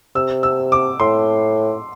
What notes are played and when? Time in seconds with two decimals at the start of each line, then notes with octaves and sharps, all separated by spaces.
0.15 C3 E6
0.43 E6
0.72 D6
1.00 A2 C6